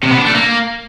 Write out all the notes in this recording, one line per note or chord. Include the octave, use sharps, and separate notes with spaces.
C3
B3
D4
A3
A#3